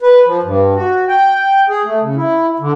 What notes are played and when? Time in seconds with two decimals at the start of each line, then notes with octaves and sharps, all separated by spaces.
0.01 B4
0.26 F3
0.43 G2
0.76 F#4
1.08 G5
1.69 G#4
1.84 A3
2.01 C#3
2.16 E4
2.59 D3